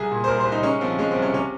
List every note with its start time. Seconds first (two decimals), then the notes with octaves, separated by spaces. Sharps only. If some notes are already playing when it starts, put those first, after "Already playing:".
Already playing: C2 G#4
0.11 A#2
0.24 C5
0.28 C2 A#4
0.40 C5
0.45 C2
0.52 D#4
0.63 G#3 C#4
0.81 F3 C4
0.99 G#3 C#4
1.11 C2 C4
1.22 C#4
1.33 C3 C#4